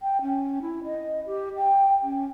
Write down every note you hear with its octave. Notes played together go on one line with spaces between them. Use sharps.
G5
C#4
E4
D#5
G4
G5
C#4